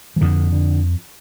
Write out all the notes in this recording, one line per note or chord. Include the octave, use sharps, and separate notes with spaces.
F3
F2 D3
D3